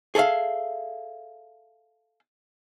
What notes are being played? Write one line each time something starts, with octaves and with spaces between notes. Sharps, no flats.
G#4 A4 C#5 E5 F5